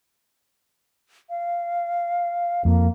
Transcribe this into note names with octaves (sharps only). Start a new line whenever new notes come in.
F5
F2 A#3